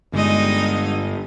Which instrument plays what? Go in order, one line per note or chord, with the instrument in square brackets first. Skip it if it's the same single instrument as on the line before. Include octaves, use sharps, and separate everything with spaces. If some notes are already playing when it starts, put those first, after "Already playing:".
[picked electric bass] G1 [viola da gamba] G#3 D#4 D#5